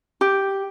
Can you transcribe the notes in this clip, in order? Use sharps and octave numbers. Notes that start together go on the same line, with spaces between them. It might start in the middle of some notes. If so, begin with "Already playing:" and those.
G4